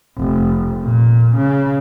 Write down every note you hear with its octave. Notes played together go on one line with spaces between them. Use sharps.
F1
A#2
C#3